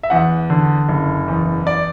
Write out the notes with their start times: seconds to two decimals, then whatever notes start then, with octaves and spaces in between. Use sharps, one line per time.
0.03 E5
0.10 E2 F#5
0.50 D3
0.89 F#1
1.28 E2
1.67 D5